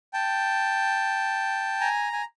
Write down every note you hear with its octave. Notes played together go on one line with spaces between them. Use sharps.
G5 A5
G#5 A#5
G#5